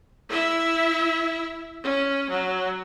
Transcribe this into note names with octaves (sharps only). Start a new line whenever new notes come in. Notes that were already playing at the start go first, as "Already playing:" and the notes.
E4 E5
C#4
F#3